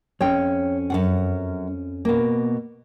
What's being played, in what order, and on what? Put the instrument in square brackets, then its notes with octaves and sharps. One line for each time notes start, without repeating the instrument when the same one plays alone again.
[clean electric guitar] F2 C#4 [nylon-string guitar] C#5 G5
[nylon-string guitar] F#2 C#3 F#5
B2 A#3